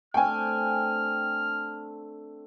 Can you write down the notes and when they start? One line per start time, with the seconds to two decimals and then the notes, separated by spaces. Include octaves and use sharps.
0.14 A3 C4 D4 G5 G#5 F6